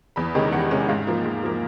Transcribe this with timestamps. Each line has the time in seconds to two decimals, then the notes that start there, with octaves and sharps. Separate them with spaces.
0.16 E2 B5
0.35 C3 D#3 G#3 C#4
0.52 E2 F#5
0.71 C3 D#3 G#3 C#4
0.89 G#2 F5
1.07 F3 A#3
1.25 G#2
1.43 F3 A#3